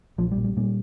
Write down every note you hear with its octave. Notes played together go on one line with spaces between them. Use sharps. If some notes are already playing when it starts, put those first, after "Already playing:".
A#1 F3
G3
A#2
G3
A#2 G3